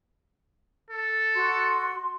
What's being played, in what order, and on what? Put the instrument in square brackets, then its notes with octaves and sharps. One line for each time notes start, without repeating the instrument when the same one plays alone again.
[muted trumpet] A4
[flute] F#4 [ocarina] C6